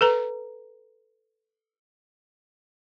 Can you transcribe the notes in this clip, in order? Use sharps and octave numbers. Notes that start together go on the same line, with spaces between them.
A4 B4 A#5